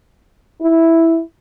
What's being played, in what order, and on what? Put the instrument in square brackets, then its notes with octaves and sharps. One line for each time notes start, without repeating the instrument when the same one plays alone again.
[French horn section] E4